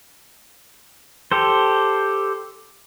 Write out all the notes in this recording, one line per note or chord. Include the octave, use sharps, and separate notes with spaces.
G4 A4 C5